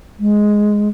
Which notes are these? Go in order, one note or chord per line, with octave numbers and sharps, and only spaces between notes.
G#3